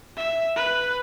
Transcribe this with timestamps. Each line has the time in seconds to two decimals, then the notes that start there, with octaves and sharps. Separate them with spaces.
0.17 E5
0.56 B4